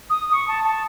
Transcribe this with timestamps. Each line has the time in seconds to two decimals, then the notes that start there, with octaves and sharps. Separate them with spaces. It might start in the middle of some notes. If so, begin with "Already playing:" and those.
0.09 D#6
0.32 C#6
0.47 A5
0.63 A5